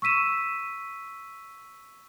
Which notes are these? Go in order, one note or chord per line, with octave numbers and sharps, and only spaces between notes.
C#6 E6 B6 D#7 E7